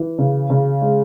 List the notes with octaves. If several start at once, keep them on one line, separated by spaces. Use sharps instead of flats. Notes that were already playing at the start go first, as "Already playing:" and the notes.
Already playing: E3
C#3
C#3
G#3